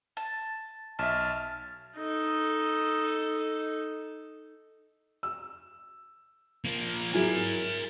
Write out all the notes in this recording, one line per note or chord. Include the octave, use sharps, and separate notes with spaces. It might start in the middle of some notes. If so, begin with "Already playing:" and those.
A5
B1 E5 A5 F6
D#4 A4
E6
F3 A#3
F#3 E4 G#4 A#4 G#5